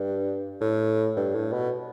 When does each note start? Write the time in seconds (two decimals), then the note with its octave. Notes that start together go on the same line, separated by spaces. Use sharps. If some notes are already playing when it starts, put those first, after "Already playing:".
Already playing: G2
0.61 A2
1.16 G2
1.35 A2
1.53 B2